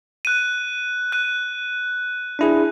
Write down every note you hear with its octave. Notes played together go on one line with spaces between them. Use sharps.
F#6 D#7
F#6 D#7
D4 E4 G#4